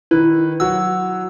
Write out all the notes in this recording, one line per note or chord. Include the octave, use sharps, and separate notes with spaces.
D#3 E4 B4
F#3 F#4 E6